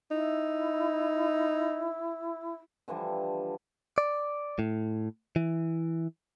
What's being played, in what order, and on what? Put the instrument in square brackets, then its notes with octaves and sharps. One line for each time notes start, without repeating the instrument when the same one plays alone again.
[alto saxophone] D#4 [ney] E4
[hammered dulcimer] D3 E3 F3 G3
[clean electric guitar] D5
A2
E3